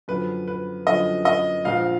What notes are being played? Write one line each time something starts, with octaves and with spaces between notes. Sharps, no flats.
F#2 D3 F3 B4
B4
F#2 D3 F3 D#5
D#5
A#1 G#2 F3 F5